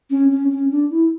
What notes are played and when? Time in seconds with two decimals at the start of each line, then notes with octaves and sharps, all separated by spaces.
0.10 C#4
0.30 C#4
0.51 C#4
0.71 D4
0.90 E4